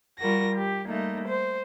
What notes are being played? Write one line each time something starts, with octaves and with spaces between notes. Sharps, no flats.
G3 F4 F#4 A#4 A#6
G4
G3 A3 A#3 D#4
C5